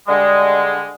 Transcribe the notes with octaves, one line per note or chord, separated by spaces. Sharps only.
D3 G3 G#3